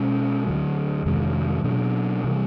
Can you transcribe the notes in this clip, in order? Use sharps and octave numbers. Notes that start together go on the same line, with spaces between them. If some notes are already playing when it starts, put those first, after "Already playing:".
Already playing: B2 G#3 C#4
D2 D3 F#3
F2 C3 D#3 G#3
B2 F#3 B3 D4
C3 E3 G3